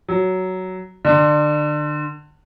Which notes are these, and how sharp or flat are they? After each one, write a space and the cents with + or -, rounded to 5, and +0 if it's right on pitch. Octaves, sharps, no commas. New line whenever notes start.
F#3 +10
D3 +30